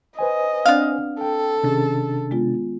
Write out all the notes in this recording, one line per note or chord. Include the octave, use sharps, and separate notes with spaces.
B4 C5 D#5 G#5
B3 C4 D4 D5 F5
A4 G5
C3 D#3 C#4 D4 G#4 A6
G#3 B3 F4